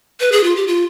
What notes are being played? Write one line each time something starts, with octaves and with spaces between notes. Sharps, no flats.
B4
G#4
F4
G4
F4